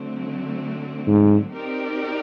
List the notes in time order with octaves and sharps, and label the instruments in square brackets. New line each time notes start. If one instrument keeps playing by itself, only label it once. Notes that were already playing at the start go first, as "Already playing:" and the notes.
Already playing: [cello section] D3 F#3 A3 C4
[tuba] G#2
[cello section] C4 D#4 G4 A#4 D5